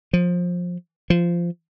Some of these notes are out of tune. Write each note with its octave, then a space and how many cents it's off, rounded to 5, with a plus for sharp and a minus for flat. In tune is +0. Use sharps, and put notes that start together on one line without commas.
F3 +20
F3 -15